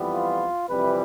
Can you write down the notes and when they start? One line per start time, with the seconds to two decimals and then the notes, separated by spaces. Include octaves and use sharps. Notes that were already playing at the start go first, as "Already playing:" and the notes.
Already playing: F2 E3 G3 B3
0.13 F4
0.69 F2 C3 E3 G3 B4